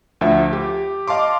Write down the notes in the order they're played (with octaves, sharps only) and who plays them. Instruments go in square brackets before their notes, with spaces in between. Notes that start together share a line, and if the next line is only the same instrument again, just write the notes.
[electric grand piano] D2 F3 E5
G4
D#5 F5 A5 C6 D6